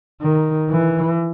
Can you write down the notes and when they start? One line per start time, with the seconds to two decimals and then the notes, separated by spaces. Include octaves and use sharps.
0.22 D#3
0.70 E3